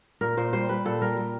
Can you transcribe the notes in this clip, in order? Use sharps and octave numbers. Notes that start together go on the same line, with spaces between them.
A#2 A#4
A#2 C5
G3 C5
G3 B4
A#2 A4
G3 A#4
G3